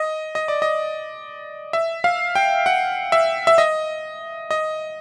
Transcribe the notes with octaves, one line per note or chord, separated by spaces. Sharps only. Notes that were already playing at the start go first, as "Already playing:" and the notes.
Already playing: D#5
D#5
D5
D#5
E5
F5
G5
F#5
E5
E5
D#5
D#5